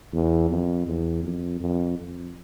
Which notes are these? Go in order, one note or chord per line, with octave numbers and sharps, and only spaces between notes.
E2
F2
E2
F2
F2
F2